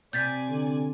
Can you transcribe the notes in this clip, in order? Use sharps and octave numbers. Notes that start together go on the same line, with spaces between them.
C3 D5 G#5 G6 A6 B6
D3